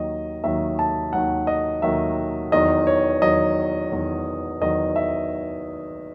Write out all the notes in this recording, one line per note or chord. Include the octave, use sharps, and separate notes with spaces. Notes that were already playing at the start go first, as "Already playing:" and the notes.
Already playing: D#2 D#3 F#3 D#5
D#2 D#3 F#3 E5
A5
D#2 D#3 F#3 F#5
D#5
D#2 D#3 F#3 E5
E2 D#3 F#3 D#5
C#5
E2 D#3 F#3 D#5
E2 D#3 F#3
E2 D#3 F#3 D#5
E5